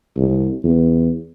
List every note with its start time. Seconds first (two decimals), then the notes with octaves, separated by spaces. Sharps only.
0.17 C2
0.64 E2